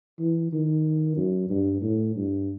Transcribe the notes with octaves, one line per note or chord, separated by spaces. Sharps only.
E3
D#3
F#2
G2
A2
G2